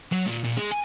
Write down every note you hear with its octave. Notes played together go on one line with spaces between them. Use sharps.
F#3
A#2
A#2
G#3
G#5